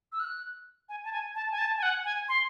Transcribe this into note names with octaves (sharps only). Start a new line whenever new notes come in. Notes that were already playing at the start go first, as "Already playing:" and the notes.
E6
F#6
G#5
A5
G#5
A5
G#5
A5
G#5
F#5
G#5
C6